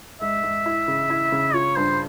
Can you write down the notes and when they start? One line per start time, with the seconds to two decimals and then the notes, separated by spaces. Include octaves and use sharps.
0.21 G#2 E5
0.43 G#2
0.66 E4
0.88 C#3
1.10 E4
1.32 C#3
1.54 F4 C#5
1.76 G2 C5